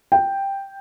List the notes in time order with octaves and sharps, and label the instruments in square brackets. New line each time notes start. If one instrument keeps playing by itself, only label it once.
[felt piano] G5